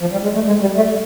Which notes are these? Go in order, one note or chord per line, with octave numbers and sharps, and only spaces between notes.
F3
G3
G#3
A3
G#3
G3
A3